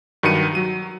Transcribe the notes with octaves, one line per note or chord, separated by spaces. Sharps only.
G2 D#3 F#3 C#7 D#7
F#3 D#7